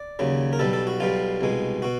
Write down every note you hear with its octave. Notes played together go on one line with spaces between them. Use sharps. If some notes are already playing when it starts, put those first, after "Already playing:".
Already playing: D5
D#2 C#3 F#3
A#4
B1 B2 G3 A4
A4
F#4
B1 B2 G3 F4
C2 B2 G#3
B2 F#4